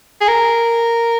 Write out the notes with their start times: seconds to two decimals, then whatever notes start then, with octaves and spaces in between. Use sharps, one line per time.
0.21 G#4
0.28 A#4